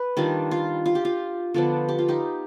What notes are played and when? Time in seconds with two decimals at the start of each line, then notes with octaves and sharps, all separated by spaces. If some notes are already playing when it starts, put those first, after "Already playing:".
Already playing: B4
0.17 D#3 G3 D4 F4
0.51 F4
0.86 F4
0.95 G4
1.05 F4
1.54 D3 F3 B3 D4 F4
1.89 G4
1.99 F4
2.08 D#4 G4